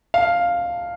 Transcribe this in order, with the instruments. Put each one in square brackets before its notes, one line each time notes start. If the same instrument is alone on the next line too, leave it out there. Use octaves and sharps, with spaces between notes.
[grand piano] F5